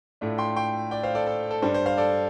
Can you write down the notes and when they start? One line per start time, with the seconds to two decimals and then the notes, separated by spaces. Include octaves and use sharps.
0.21 A2 A3 D4 F4
0.38 G5 C6
0.56 G5 C6
0.91 D5 G5
1.03 C5 F5
1.15 A4 D5
1.27 A4
1.51 A4
1.62 G2 G3 D4 C5
1.74 C5
1.86 C5 F5
1.98 A4 D5